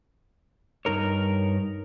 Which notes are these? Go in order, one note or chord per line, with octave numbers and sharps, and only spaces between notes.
G2 B2 D#4 A#4 C#5